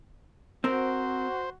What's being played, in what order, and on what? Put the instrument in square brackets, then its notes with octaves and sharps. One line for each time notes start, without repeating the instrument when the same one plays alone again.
[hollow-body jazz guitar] C4 A#4 [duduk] F#4 [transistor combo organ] C5